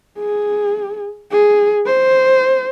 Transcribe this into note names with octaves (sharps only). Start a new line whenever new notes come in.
G#4
G#4
C5